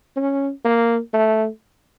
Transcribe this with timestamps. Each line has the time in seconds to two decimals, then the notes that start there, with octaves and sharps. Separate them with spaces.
0.16 C#4
0.65 A#3
1.13 A3